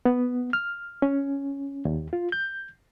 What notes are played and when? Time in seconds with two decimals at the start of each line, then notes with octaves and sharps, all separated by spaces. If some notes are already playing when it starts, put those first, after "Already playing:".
0.05 B3
0.53 F6
1.02 C#4
1.85 D#2
2.13 F4
2.32 G6